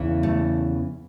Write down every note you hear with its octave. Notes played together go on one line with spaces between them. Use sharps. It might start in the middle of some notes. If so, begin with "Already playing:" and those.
Already playing: E2 C#3 E3
A3